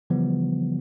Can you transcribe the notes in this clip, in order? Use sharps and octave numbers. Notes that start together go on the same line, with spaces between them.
C#3 E3 F3 G3 B3